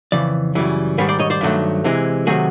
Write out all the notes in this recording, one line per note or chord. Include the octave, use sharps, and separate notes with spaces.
F2 C#3 E3 D5
F#2 C#3 E3 G3
G#2 D#3 G3 B4 C#5
C5 D5
C#5 D#5
C5 D5
G2 D#3 F#3 A3
C3 E3 G#3
C3 D#3 F#3 A3 F#4 G#4